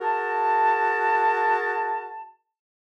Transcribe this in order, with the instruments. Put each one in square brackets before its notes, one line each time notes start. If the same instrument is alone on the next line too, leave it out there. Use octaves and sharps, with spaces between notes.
[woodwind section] F#4 G#4 A#4 A5